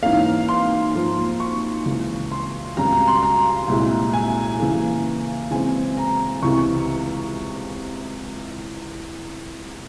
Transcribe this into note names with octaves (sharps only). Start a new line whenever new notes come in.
G#2 E3 A#3 C#4 F5
C6
G#2 F3 A#3 F4
C#6
C#2 C#3 E3
C6
C#2 C#3 G3 A#5
A#5
C6
A#5
C2 A#2 G#3 E4
G#5
C#3 E3 A#3
C#3 E3 G#3 C4 G#5
A#5
C#2 C3 E3 G#3 E4 C#6